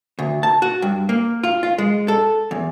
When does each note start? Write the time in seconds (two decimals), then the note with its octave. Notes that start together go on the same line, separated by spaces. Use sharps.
0.19 D2
0.43 A5
0.62 F#4
0.82 G2
1.09 A#3
1.43 F4
1.63 F4
1.78 G#3
2.08 A4
2.51 E2